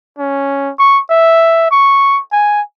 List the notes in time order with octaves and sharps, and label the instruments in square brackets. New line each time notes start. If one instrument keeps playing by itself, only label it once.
[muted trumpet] C#4
C#6
E5
C#6
G#5